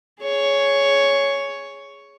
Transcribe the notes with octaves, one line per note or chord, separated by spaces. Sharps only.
G#4 C#5